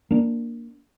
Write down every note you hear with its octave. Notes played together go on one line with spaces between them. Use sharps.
A#3 D4